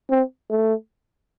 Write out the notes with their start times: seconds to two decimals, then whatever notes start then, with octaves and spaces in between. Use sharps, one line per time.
0.10 C4
0.50 A3